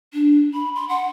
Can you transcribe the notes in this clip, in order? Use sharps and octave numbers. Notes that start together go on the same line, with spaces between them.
D4
B5
C6
F#5